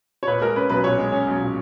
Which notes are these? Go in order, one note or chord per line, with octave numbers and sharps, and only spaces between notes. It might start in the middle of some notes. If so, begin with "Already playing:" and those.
C#5
A#2 B4
G#3 A#4
C#4 B4
B1 B4
A#2 C#5
G#3
C#4
B1
A#2